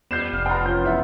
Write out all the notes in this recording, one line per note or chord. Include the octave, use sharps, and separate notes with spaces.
G3 B3 G6 C7 E7
F1 F5
B3 F4 G5 A#5
F3 C#4 G6
E2 E5 F#5